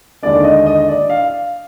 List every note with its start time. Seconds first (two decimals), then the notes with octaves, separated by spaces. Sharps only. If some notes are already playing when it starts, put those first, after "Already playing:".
0.23 D#2 D3 G#3 D4 D5
0.44 D#5
0.66 D#5
0.88 D5
1.10 F5